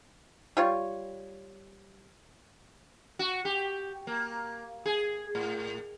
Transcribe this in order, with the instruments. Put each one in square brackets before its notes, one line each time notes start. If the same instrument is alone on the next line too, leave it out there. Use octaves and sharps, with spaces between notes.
[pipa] G3 F4 C#5
[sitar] F#4
G4
A#3
G#4
A2